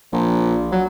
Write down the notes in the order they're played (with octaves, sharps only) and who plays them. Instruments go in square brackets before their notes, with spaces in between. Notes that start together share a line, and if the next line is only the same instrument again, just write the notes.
[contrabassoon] A#1
F#3